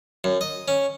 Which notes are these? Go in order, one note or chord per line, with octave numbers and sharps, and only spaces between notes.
F#2
D#5
C#4